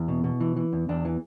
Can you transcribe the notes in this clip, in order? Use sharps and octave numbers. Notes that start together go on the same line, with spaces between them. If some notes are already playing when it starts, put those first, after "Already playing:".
Already playing: E2 E4
B2
B2
E3
E3
E2
E2 D4
E3